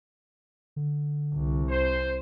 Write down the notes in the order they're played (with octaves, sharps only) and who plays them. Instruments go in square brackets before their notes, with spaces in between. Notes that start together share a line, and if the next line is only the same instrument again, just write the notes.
[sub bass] D3
[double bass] C2
[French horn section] C5